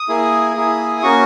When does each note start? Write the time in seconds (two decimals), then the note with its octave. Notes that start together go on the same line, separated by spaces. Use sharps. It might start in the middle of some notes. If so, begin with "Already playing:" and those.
Already playing: D#6
0.08 A#3 E4 G#4
0.55 A#3 E4 G#4
1.03 A#3 C#4 F#4 C#6